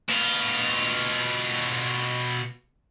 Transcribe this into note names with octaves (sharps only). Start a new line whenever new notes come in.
B2 F4